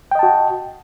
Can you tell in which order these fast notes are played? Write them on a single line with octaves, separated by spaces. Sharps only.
G5 D#5 A5 F#4